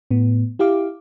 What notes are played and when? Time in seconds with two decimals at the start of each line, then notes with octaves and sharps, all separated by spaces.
0.11 A2 B3
0.59 E4 G4 F5 D6